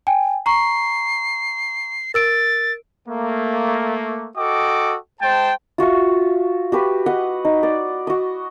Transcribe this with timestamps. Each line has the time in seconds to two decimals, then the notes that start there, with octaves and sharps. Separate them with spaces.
0.07 G5 G#5
0.46 A#5 C#6 C7
2.14 A#4 E6 A6 D7
3.08 A3 A#3
4.37 F#4 A4 D#5 G5 D6
5.21 G#3 C5 G5 A5
5.78 F4 F#4 E5 C#6
6.72 F#4 G4 B4
7.06 B4 D#5 F#5
7.45 D#4
7.63 D5 D#5
8.07 F#4 D#5